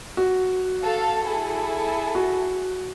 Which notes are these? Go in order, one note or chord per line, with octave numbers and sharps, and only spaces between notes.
F#4
A4 F5 A5
E4 G#4 A4
F#4